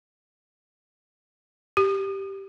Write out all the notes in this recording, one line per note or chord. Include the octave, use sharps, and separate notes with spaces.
G4